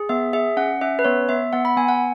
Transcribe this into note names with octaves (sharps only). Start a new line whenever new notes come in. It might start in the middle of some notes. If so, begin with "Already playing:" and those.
Already playing: G#4
B3 E5
G#4 E5
C#4 F#5
C#4 E5
B4
B3 C#5
B3 E5
B3 F#5
B5
B3 G#5
F#5